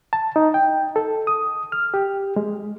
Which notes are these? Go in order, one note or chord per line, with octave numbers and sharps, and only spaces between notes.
A5
D#4
G5
A4
D#6
F6
G4
G#3